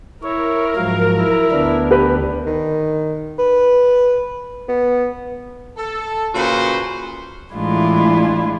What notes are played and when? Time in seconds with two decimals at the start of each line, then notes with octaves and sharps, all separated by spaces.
0.24 E4 A#4 C#5
0.76 G#2 F3 F#3 F5
1.19 E4
1.52 D2 B3 D4
1.91 G4 B4
2.47 D#3
3.39 B4
4.68 B3
5.77 A4
6.35 A#2 C#3 F#4 B4 C5
7.55 A2 E3 G#3 D4 E4 F4